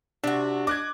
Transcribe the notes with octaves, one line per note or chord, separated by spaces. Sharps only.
C3 D4 F#4
D#5 D6 F#6 G#6